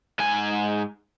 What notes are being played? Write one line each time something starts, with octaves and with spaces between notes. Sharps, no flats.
G#2 G#5